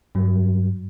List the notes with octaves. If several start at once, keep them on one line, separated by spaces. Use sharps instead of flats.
G2 F#3